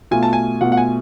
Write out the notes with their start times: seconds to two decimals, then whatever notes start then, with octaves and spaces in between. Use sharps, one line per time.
0.11 B2 A3 F4 G#5
0.23 A5
0.33 G#5
0.61 B2 A3 F4 F#5
0.72 F#5
0.77 G#5